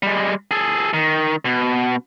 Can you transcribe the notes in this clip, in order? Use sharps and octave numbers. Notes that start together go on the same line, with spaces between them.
G3 G#3
G#4 A4
D#3
B2